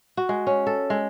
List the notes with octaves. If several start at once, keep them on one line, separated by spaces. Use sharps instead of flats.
F#4
G#3
C#4
A4
G#3